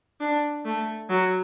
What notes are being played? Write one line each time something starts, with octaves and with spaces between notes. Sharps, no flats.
D4
A3
F#3